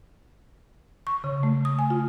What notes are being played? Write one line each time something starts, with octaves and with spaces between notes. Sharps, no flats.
C#6
C#3
A3
D#6
G#5
F4